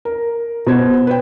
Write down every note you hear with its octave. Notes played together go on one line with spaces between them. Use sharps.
A#4
B2 B3 C5 G#6
B4 C5 G5